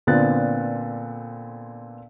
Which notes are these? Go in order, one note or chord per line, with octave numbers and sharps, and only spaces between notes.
A#2 D3 B3 C4 F#6 A6